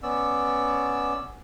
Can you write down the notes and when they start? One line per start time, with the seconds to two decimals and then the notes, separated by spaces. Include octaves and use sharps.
0.03 B3 C#4 D5 E6